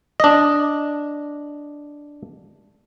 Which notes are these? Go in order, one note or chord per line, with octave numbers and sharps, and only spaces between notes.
D4 D#5